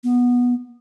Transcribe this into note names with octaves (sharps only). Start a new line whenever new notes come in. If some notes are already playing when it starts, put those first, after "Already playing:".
B3